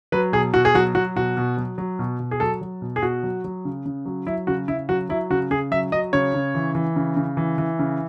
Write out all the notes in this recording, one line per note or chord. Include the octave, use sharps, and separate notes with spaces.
F#3 B4
B2 G#4
B2 F#4
G#4
F#3 F#4
F#3 F#4
B2 F#4
B2
F#3
F#3
B2
B2
G#4
F#3 A4
F#3
B2
G#4
B2 F#4
F#3
F#3
C#3
C#3
F#3
F#3 E4
C#3 F#4
C#3 E4
F#3 F#4
F#3 E4
C#3 F#4
C#3 G#4
F#3 E5
F#3 D#5
C#3 C#5
C#3
E3
E3
C#3
C#3
E3
E3
C#3